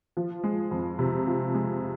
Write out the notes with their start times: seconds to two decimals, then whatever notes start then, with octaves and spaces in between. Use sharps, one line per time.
0.17 F3
0.44 G#3
0.71 F2
0.99 C3
1.27 F3
1.54 G#3